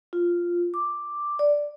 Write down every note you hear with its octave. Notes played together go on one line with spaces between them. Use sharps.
F4
D6
D5